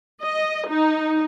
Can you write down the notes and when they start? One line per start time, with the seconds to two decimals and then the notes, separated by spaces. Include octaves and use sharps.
0.21 D#5
0.68 D#4